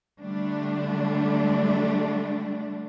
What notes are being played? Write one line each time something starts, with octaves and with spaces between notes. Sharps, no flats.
D3 G3 A3 D4